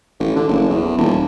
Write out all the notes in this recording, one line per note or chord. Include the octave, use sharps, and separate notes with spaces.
A1
D3
F#1
E2
D#1